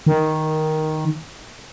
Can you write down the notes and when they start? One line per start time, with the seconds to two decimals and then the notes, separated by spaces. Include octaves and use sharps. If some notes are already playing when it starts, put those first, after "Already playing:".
0.06 D#3